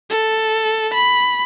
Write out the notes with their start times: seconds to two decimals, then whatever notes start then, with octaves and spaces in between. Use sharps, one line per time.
0.10 A4
0.94 B5